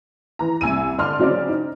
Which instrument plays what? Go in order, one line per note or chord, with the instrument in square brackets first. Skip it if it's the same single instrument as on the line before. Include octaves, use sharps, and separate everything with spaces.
[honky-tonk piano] E3 A#5
C2 G#5 E6 D#7
D3 D5 A5 C6 F6
C#3 F#3 C4 F#4 D5
D#4